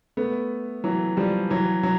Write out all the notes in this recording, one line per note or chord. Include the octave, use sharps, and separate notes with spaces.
A3 B3
E3 F#3
F3 G3
E3 F#3
F#3